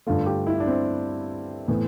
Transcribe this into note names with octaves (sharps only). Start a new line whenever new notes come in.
G2 D3 A3 F4
G4
E4
D4
C4
A2 E3 B3